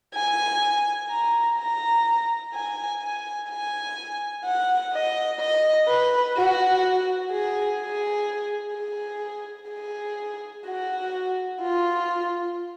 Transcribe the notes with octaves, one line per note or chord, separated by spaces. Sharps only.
G#5
A#5
A#5
G#5
G#5
G#5
F#5
D#5
D#5
B4
F#4
G#4
G#4
G#4
G#4
F#4
F4